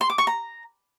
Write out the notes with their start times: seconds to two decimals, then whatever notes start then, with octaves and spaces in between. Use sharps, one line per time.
0.01 C6
0.10 D6
0.18 C#6
0.27 A#5